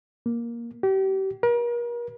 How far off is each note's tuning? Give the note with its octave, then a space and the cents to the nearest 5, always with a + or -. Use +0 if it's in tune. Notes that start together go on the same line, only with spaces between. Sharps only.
A#3 +10
G4 -35
A#4 +40